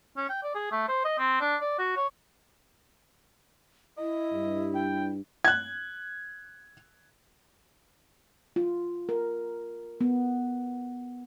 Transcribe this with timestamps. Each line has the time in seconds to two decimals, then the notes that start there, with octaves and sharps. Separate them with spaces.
0.17 C#4
0.29 G5
0.43 D5
0.55 G#4
0.71 A3
0.88 C5
1.04 D#5
1.18 C4
1.41 D4
1.61 D5
1.78 F#4
1.96 C#5
3.98 E4 D#5
4.32 G2
4.75 G5
5.45 F#6 G#6
8.56 F4
9.09 A#4
10.01 B3